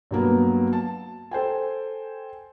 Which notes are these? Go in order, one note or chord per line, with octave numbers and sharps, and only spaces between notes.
G2 F#3 A#3 B3
A5
A4 C5 G5 G#5